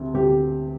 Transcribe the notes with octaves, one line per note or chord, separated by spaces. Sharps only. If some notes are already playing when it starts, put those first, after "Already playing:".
Already playing: D2 C3
D2 G4